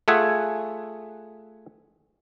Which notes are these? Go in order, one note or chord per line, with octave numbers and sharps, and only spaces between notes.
A3 F4 G#4 E5 F#5 G#5